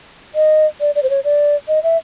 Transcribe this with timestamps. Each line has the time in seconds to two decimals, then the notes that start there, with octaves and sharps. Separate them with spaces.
0.35 D#5
0.81 D5
0.95 D5
1.03 C5
1.10 C#5
1.24 D5
1.68 D#5
1.83 E5